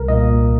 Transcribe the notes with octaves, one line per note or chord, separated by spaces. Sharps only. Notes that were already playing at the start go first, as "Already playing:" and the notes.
Already playing: C2 A#4
A#2 A#3 D#5